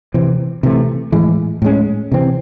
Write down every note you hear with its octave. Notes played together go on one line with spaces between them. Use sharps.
C3 E3 C4
C3 E3 A3
A2 E3 G#3
A2 G#3 C#4
C3 E3 C4